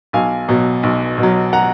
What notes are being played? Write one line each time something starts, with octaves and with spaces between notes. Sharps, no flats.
B1 F5 G#5
B2 F#3
B1
B2 F#3
F#5 A#5